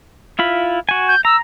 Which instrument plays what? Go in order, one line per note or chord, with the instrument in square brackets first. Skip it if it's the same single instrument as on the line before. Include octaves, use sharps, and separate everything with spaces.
[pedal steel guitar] E4 F4 B5
F#4 G#5
[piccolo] G6
[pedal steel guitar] A#5 [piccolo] E6